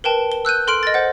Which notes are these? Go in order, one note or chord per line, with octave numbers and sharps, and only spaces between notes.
A#4 B4 G5 A5
G7
E6 F#6 G6 D#7
A4 C6 F6 D7 F#7
D#5 A6
C5 F#5